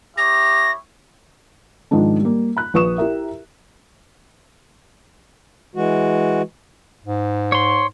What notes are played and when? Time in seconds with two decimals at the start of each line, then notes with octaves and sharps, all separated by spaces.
0.17 E4 G4 C#5 A#6
1.91 G#2 D#3 F3 G#3 D4
2.20 G3 A#3
2.57 B5 F#6
2.74 A#1 B4 C#6 D#6 E7
2.98 E4 G4 A#4 E5
5.76 E3 G#3 F#4
7.05 G#2
7.52 C#5 C6